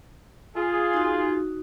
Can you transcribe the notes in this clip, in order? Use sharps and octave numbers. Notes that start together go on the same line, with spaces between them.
F4 G#4
D#4 F#4